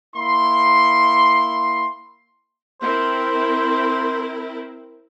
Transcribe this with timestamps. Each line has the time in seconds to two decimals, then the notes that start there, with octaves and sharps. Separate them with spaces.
0.15 A#3 E4 C6
2.82 C4 E4 A#4 C5